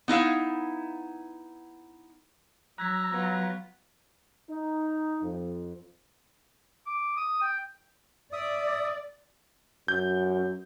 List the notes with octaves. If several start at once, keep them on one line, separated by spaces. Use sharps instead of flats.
B3 D#4 E4 F5
F#3 A#5 E6 F#6 G#6 B6
F#3 B3 F4
D#4
F2
D6
D#6
G5
D5 E5 D#6
F#2 G6